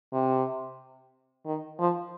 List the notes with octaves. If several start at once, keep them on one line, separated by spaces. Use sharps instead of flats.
C3
D#3
F3